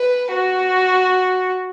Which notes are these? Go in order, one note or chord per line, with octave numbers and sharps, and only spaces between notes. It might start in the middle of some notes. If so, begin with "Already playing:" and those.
Already playing: B4
F#4